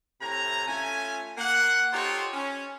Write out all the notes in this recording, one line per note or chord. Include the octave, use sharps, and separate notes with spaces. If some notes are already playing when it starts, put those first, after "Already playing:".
A2 C3 G#5 A#5
A3 C#4 F4 G#5
A#3 F#5
D#4 F4 G4 A4 C5 C#5
C#4